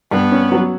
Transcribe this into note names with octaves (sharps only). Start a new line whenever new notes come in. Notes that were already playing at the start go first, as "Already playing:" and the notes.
G2 B3
C#4
F#3